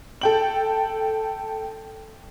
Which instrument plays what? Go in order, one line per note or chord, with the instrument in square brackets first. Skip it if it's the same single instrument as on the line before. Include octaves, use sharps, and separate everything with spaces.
[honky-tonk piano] A4 G5 F#7